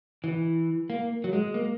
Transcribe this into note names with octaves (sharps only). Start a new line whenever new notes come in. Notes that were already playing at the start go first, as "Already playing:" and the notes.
E3
A#3
F#3
G#3
A#3